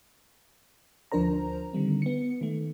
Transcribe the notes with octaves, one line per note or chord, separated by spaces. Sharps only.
D2 F3 D4 A#4 C5 A#5
D3 D#3 G3 C4
B3 C#7
D#3 A3